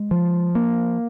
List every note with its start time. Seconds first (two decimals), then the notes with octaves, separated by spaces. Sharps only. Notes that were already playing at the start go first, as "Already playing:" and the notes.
Already playing: G#3
0.11 F3
0.55 A#3